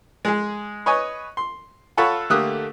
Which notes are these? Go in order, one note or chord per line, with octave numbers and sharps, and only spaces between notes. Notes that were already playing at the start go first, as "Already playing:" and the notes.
G#3 G#4
B4 C#5 D#5 G#5
C6
F4 A4 C#5 F#5 A5 B5
D3 A3 A#3 G4 D#6 F#6